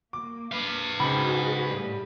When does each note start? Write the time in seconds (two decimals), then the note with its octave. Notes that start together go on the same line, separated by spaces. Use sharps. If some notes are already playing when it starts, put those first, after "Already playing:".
0.13 A#3 D6
0.52 B4 F5
1.00 C#2 G#2 F#4 G#4 B5
1.70 A2 G3